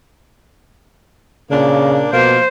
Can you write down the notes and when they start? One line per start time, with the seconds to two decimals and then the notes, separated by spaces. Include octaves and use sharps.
1.51 A#2 C#3 A#3 D4
2.13 B2 F3 A#3 C5